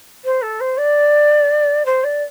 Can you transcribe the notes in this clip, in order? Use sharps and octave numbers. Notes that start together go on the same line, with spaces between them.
C5
A4
C5
D5
C5
D5